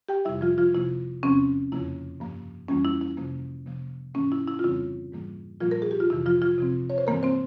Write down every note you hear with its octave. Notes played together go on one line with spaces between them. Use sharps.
G4 G5
F2 C3 G3 E4 E5
F3 F4
F3 F4
C3 F3 A#3 E4
E2 C3 F3 C4 C#4
F2 C#3 F3 A#3 E4
G2 F3 A#3
F2 E3 G3 A#3 C#4
E4
E4
F2 C3 F3 A#3
C3 F3 A#3
G#2 E3 A#3 C#4
E4
E4
F4
F2 C#3 E3 G3 C4 E4
G#2 E3 G3 A#3
A#2 F3 G3 A#3 F4
A#4
G#4
G4
F4
F2 C3 E3 E4
F3 F4
F3 F4
C3 F3 C4
C#5
C5
G2 E3 G#3 A#3 C4 A#4
C4 C5